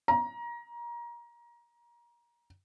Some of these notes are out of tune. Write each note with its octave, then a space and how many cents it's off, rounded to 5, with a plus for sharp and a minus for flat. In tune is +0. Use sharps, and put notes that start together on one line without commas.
A#5 +25